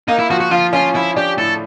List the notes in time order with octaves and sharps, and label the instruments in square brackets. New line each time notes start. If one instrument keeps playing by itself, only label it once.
[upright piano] A#3 [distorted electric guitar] D#4
[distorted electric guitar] E4
[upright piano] F3 [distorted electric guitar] F#4
[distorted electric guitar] F#4
[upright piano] F3 [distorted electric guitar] F4
[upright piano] C#4 [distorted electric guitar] F4
[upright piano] F3 [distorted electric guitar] E4
[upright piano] D4 [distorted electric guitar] G4
[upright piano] A2 [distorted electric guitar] A4